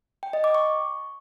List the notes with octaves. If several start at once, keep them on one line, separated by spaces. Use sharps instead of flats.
G5
D#5
D6
C#6